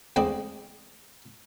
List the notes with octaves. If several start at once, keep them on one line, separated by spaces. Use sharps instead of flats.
E2 G#3 A3 C4 D4 D#6